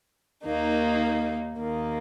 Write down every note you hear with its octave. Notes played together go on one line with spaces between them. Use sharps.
D#2 D#3 A#3 D#4
D#2 D#3 A#3